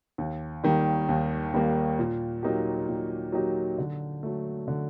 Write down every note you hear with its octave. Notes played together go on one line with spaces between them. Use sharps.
D#2
D#3 G3 A#3
D#2
D#3 G3 A#3
A#2
F#3 A#3 D#4 G4
A#2
F#3 A#3 D#4 G4
D3
F#3 A3
D3